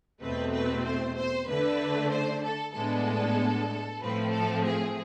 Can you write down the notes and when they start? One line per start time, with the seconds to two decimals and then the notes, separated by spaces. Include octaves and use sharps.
0.21 E2 B2 A3 C4 B4
0.53 B4
0.85 C5
1.17 C5
1.47 D3 A3 D4 B4
2.11 C5
2.43 A4
2.74 A2 G#3 B3 D4 A4
4.01 A2 F3 A3 C4 B4
4.32 A4
4.64 G#4